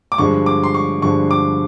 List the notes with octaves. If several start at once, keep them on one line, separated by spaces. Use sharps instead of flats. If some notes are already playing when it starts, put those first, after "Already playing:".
D6
G2 D3 F3 G#3 C#6
D6
C6
C#6
G2 D3 F3 G#3 C#6
D6